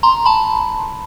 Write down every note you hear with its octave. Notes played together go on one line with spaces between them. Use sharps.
A#5 C6
A5 B5